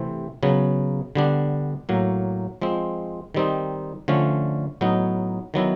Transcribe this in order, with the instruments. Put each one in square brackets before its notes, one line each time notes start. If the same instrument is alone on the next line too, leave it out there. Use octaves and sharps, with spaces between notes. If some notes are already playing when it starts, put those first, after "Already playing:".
Already playing: [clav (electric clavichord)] C3 E3 A3 C4
C#3 F#3 B3
D3 G3 B3 D4
A2 F#3 A#3
F3 G#3 C4
D#3 G3 C4 D#4
D3 F3 A3 C#4
A2 F#3 B3 D#4
D#3 F#3 B3 E4